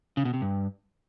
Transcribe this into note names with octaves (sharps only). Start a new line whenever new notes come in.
C#3
B2
C3
G2